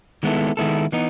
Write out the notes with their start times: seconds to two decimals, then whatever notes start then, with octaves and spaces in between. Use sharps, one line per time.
0.23 D#3 G#3 B3 E4 A4
0.57 D#3 G#3 B3 E4 A4
0.92 E3 B3 D#4